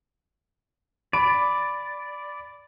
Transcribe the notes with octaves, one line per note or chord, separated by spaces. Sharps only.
D5 B5 D7